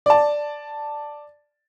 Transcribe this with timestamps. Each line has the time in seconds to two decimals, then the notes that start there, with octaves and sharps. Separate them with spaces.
0.06 D5 A5